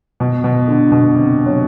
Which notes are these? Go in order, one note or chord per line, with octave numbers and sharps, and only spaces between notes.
B2
B2
D3
B2
C3
F#3